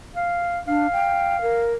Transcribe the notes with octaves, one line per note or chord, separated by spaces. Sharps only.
F5
D4 F5
G5
A#4